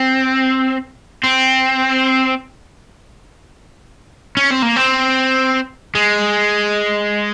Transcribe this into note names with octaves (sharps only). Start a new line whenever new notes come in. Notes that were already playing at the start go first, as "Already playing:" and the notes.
Already playing: C4
C4
C#4
C4
A#3
C4
G#3